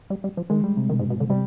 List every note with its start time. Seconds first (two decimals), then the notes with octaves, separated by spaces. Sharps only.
0.10 G3
0.24 G3
0.37 F3
0.50 D#3 G#3
0.64 G3
0.77 C3
0.89 B2 D#3
0.99 G#2
1.03 G2
1.10 B2
1.17 G#2 D3
1.29 C3 G3